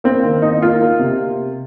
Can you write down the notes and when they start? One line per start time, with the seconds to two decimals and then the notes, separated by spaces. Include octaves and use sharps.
0.04 A#3 C4
0.23 D#3
0.42 A#3 D#4
0.62 A#3 F4
0.81 A#3
0.99 C3